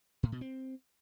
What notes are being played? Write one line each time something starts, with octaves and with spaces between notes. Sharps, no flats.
A2
B2
C4